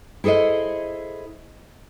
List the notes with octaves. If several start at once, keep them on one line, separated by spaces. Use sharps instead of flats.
E4 G#4 A4 C5 D#5